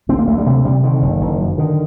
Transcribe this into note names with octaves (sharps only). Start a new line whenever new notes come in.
D2 C4
A#3
D2 A3
G3
C3 A3
C3 G3
D3 D#3
F#1
F#1
F#2
D3 D#3